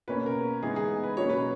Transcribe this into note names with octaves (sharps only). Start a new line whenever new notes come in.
B2 A#3 C#4 B4
A#4
E3 G#3 B3 D#4 G#4
G#4
B4
B2 F#3 A#3 C#4 C#5
B4